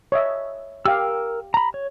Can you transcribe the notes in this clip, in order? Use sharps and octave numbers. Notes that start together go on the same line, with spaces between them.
C#5 D#5 E5
G4 A#4 F5 E6
A#5 B5
C#5